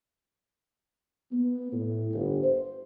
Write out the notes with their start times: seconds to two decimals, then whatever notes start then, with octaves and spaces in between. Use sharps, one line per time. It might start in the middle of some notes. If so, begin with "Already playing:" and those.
1.32 B3
1.73 A2
2.13 G1
2.43 C5